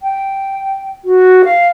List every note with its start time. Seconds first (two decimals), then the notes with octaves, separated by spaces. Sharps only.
0.02 G5
1.05 F#4
1.44 F5